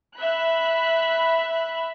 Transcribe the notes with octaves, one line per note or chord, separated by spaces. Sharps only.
E5 B5 F#6